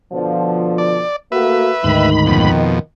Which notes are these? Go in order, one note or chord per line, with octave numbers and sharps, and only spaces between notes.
B2 D3 F3
D5
A3 A#3 F#4 B4 E5
D2 G#2 D#3 B5
F2 B2